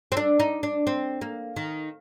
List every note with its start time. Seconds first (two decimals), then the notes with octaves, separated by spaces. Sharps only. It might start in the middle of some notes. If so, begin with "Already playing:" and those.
0.12 C4
0.17 D4
0.40 D#4
0.63 D4
0.87 C4
1.21 A#3
1.56 D#3